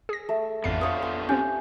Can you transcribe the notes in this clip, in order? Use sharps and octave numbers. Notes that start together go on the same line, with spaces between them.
G#4 A#6
A3
A1 F2 B3 D4 F4 C7
C5 C#5 F5 D#6
C6
C4 C#4 G4 G#5 G6